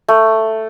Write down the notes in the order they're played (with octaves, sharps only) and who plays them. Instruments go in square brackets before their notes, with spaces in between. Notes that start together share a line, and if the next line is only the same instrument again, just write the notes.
[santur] A3